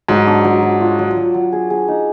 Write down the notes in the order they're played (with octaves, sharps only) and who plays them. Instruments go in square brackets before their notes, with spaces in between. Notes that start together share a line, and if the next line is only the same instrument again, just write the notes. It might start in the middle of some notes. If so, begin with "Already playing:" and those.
[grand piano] G#2 [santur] F#3
[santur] D4
F#3
F#3
F4
F#3
F#3
F#3
G#4
G#4
D#4